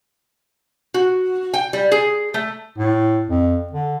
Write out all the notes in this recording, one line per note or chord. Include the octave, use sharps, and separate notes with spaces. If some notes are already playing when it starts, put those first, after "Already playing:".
F#4
G5
G3
G#4
A3
A2
F2
D3